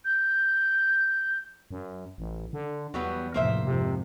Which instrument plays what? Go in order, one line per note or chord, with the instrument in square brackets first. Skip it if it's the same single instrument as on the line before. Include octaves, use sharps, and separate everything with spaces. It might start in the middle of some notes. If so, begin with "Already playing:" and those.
[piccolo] G6
[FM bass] F#2
A1
D3
[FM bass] E2 [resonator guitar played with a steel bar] F#3 G3 B3
[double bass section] F1 A#1 A2 [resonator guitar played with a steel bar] A#3 C5 E5
[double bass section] F2 G#2 [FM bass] C3